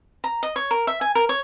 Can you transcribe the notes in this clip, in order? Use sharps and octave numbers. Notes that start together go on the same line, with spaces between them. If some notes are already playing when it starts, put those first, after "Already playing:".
A#5
D#5
C#5
A#4
E5
G#5
A#4
C#5